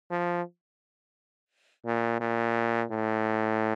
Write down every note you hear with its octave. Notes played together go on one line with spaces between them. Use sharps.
F3
A#2
A#2
A2